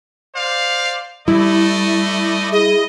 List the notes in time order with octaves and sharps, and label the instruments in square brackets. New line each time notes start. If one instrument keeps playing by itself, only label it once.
[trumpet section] C5 D5 F5
[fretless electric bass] G3 [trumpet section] A3 D5 D#5 [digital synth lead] E4
[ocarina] G#4 [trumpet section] D#5